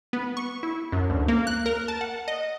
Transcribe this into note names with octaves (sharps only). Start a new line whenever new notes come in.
B3
C#6
E4
F#2
D2
A#3
F#6
A#4
A5
F#5
D#5